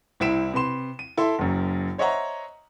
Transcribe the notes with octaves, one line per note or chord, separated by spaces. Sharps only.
C2 C4 E4 B6 D7 E7
C3 B4 B5 C6 E7
D#7
E4 A4 E5 C6
F#1 F#2
C5 C#5 D#5 E5 F#5 A#5